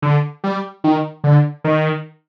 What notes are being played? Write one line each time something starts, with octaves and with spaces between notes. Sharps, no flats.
D3
G3
D#3
D3
D#3